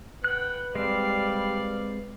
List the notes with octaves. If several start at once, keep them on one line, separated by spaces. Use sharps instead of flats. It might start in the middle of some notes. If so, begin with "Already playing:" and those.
B4 F#5 G5 F#6
G3 G#3 C4 D5 F5